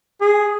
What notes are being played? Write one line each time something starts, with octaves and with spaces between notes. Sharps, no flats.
G#4